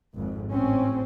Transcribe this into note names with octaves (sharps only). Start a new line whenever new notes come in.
G#1 F2 G#2
A1 C4 C#4